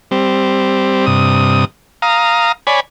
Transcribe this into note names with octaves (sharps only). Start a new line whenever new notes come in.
G3 C4
G2 C3 D#6
F5 A#5 D#6
C#5 D5 G#5 B5